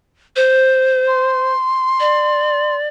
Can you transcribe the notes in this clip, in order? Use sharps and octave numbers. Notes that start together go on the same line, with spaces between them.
C5
C6
D5